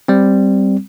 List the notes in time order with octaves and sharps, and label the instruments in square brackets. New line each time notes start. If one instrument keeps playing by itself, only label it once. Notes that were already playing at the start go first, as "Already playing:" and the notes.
[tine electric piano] G3 C4